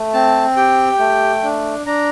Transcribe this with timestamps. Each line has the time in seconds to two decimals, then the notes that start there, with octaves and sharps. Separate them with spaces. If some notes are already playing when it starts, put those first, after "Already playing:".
Already playing: A3
0.14 C4 A5
0.56 G4 G5
0.99 A3
1.44 D4
1.86 D4 A#5